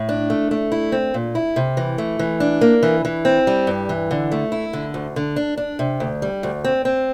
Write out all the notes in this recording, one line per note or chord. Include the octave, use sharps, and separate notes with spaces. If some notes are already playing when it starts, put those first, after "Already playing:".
Already playing: A2
D4
A3
A3
E4
C4
A#2
E4
C3
E3
A3
E3
D4
A#3
E3
E3
C4
G3
G2
E3
D3
A3
E4
D3
D2
D3
D4
D4
C3
D2
G3
D2
C4
C4